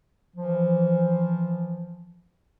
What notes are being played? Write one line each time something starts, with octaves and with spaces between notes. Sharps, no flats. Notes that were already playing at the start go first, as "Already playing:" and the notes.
E3 F3